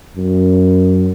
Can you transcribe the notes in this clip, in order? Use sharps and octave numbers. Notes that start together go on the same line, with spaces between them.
F#2